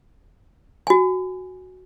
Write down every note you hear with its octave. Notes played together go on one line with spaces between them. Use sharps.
F#4 G#5